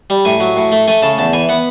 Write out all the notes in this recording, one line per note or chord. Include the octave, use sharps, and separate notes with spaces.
G3
A2 G#5
F#3
A2
A3
A3 G#5
C#3 A5
E2 A5
E3 G#5
B3 F#5